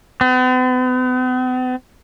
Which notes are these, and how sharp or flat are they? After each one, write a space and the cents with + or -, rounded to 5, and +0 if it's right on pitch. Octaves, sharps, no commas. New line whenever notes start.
B3 +45